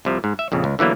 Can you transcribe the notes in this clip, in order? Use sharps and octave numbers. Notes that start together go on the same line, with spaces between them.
C2 C3 F3
G#2
E5
A#1 F2 C#3
C#2
D3 E3 F#3 A#3 B3